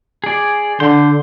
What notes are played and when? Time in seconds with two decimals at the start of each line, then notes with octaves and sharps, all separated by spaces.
0.24 G#4 D5
0.80 D3 C6 G6